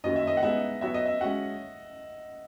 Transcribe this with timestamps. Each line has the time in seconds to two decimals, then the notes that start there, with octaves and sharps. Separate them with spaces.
0.04 F#2 D#3 F#3 A#3 D#5
0.16 E5
0.27 D#5
0.37 F#5
0.43 G#3 B3 D#4 G#4 D#5 E5
0.81 F#3 B3 F#4 C#5 E5
0.94 D#5
1.06 E5
1.21 G#3 C#4 F#4 F#5